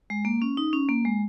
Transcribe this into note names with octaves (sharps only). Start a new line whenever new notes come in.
G#3
A#3
C#4
D#4
C#4
A#3
G#3